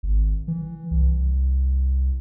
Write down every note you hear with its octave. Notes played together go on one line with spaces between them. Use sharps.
G#1
E3
C2